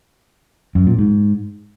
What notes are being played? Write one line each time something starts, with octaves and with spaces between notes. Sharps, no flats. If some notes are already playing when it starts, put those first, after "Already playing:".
F#2
A#2
G#2